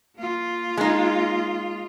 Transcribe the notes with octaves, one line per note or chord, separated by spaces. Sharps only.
A#3 F4
G#3 D#4